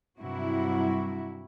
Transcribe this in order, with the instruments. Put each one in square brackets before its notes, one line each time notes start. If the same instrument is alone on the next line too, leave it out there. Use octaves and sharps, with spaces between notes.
[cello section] G2 C3 F#3 E4 F#4